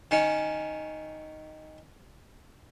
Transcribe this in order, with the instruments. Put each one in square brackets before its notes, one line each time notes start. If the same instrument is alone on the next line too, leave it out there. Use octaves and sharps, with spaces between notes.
[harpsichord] D#3 C#4